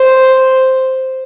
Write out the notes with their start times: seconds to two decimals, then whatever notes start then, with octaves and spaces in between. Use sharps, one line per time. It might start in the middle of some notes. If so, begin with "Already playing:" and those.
Already playing: C5